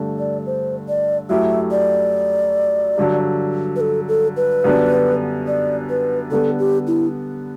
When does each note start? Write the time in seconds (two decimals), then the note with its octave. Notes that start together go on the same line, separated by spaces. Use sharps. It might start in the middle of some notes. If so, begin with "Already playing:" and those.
Already playing: G2 D3 A3
0.19 D5
0.46 C5
0.88 D5
1.29 F#2 F#3 A3 E4 G4 E5
1.71 D5
2.97 G2 D3 F#3
3.76 B4
3.81 A4
4.08 A4
4.37 B4
4.64 F#2 D3 G3 B3 D4
5.47 D5
5.90 B4
6.31 D3 G3 B3 A4
6.59 G4
6.87 E4